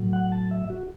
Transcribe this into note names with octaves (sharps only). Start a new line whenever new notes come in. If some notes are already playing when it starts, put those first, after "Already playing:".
Already playing: A2 F#3
F#5
A5
E5
F#4